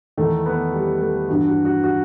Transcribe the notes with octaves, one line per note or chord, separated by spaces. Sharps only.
E2 D#3 A3
B3
G3
A3
G2 E3 F#4
F#4
F#4
F#4